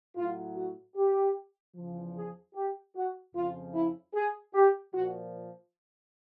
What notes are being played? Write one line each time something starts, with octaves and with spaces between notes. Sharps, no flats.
A2 F#3 F4
F#4
G4
E2 C#3 F3
G#4
G4
F#4
F2 C#3 F3 F4
E4
G#4
G4
A#2 F3 F#4